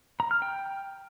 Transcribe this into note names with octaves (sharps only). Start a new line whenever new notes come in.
A#5
F6
G5